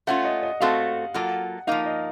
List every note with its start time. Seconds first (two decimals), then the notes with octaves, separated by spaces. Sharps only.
0.07 A3 C#4 F4 F#5
0.25 D#5
0.43 D#5
0.61 A3 C4 F#4 A4 F5
1.14 F#3 A#3 F4 A4 F#5
1.67 F3 A#3 D#4 F5
1.86 D#5